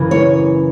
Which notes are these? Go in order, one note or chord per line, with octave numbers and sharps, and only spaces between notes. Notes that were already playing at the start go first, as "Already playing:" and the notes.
Already playing: F#2 C#3 E3
C#5